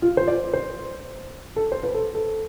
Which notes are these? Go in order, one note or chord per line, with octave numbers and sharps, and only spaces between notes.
F4
C5
D5
C5
A4
C5
B4
A4
A4